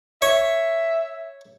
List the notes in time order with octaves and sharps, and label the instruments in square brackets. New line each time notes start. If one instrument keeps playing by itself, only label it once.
[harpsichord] C#5 [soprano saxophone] E5